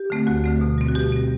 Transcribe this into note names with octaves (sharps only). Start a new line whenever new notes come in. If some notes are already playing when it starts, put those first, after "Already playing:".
Already playing: G4
D3 A3 C4
D2 F#4
D3 A3 C4
B2
G3 C4
F#4
B2 G4
G3 C4